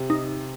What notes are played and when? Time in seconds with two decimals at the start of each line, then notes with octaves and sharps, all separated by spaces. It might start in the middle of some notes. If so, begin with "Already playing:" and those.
Already playing: C3
0.10 D#4